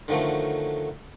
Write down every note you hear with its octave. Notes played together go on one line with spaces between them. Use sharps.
D3 D#3 F3 F#3 A3